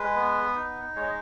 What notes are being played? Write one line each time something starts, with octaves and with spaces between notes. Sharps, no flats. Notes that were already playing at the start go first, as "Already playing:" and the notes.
Already playing: G#3 B4
B3
D#4
G#3 C#5
D#5